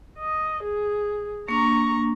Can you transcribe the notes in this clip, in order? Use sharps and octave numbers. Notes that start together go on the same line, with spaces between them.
D#5
G#4
A#3 D4 A#5 C#6